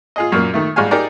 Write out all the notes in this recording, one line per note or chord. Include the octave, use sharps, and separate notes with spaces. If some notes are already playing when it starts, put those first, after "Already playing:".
F4 G#4 D#5
F#2 A#2 A#3
D#3 A3
G#2 G3 F5 G#5
D#4 G4 G#4 A#4 D5